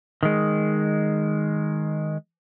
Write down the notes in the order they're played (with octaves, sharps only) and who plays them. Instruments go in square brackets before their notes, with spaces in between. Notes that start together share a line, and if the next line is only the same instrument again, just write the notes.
[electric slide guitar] D#3 G#3